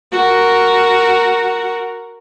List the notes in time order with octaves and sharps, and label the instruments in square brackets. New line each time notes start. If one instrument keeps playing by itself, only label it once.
[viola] F#4 A#4